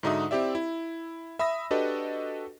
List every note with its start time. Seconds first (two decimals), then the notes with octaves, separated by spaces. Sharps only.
0.03 G#2 D3 D#4 F#4 E5 D#6
0.31 C4 E4 G4 D5 E5
0.55 E4
1.39 E5 B5 D#6 E6 A#6
1.71 D4 F#4 G4 A4 B4 D#5